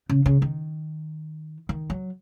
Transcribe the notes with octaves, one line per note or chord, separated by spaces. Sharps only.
C#3
C#3
D#3
D#3
F#3